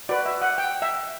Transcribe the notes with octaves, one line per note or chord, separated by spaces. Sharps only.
F#4 B4 D5
E5
F#5
G5
E5